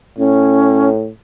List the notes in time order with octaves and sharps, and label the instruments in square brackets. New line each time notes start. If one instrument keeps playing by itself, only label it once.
[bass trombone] A2 [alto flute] C#4